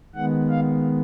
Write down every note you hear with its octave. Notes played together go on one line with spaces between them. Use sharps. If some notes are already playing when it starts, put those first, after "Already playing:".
D#3 G#3 B3 F#5
F5